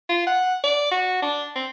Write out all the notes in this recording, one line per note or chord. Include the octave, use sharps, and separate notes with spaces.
F4
F#5
D5
F#4
D4
C4